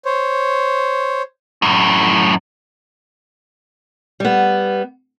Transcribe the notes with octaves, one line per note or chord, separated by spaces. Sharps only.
C5 C#5
F#2 A2
G3 B3